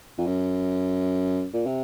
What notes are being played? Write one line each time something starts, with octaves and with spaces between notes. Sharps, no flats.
F2
F#2
A#2
C3